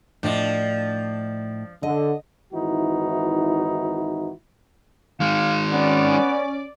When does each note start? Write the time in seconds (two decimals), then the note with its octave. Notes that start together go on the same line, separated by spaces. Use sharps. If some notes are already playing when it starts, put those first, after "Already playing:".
0.23 A2 F3 D4 D#5
1.83 D3 D#5
2.53 G#1 E3 D#4 E4 F#4
5.20 D#3 G#3 F5
5.72 B3 C#4 D5